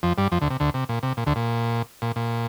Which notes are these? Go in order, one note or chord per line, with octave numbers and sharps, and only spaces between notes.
F2 F3
G2 G3
F2 F3
D2 D3
C3
D2 D3
C3
A#2
C3
A#2
D2 D3
A#2
A#2
A#2